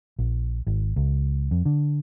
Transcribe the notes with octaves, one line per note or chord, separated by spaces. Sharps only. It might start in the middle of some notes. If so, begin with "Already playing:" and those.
A#1
G#1
C#2
F2
D3